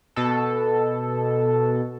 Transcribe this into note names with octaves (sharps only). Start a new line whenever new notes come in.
B2 A4